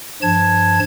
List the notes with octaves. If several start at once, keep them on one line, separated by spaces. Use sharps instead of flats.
G2 F3 A5 G#6